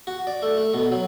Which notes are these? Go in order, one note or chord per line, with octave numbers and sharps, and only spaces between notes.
F#4
D5
A3
A3
B2
F#3